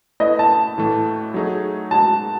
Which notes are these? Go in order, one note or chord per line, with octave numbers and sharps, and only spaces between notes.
A3 E4 B4 D#5
A5
A2 E3 A3
F#3 A3 D#4 G#4
G#3 D#4 F#4 A5